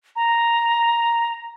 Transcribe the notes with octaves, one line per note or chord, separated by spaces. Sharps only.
A#5